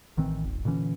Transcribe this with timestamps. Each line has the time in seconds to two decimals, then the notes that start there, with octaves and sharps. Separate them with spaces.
0.17 A1 D#3 E3 C4
0.43 D#1 G#1
0.65 A#2 D3 E3 C#4